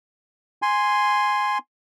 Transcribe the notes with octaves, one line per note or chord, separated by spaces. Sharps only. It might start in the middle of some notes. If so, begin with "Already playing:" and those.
G#5 C6